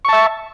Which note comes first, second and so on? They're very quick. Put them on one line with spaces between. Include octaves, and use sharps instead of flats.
C#6 A5 E5